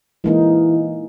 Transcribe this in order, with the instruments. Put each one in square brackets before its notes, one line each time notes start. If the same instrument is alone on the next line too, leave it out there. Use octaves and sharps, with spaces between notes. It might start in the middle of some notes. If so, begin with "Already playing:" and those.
[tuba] E3 [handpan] G#3 A#3 D#4